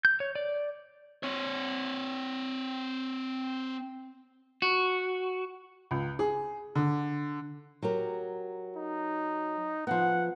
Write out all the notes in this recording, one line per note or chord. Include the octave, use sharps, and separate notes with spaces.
G6
C#5
D5
C4 C#5
F#4
C#2
G#4
D3
F#3 G4 A#4
D#4
F3 B3 F#5